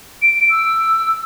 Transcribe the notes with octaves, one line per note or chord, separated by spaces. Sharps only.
D7
E6